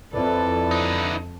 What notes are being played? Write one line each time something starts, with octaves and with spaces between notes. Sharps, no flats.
F2 E4 A4 B4 D5
D3 D#4